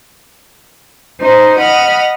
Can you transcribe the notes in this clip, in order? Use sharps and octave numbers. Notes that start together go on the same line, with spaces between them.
D#4 C5
D#5 F#5 B5 F6